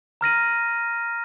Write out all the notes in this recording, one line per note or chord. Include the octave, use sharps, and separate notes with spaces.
A#5 F6 A#6 D#7